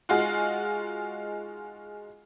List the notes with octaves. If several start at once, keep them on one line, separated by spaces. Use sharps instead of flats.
G#3 D#4 F4 F#4